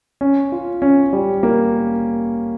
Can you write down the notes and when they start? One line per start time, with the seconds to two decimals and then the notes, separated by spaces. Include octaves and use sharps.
0.21 C#4
0.52 F4
0.82 C#4
1.13 G3
1.43 A#3